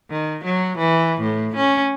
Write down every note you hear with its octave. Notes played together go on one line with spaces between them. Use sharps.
D#3
F#3
E3
A2
C#4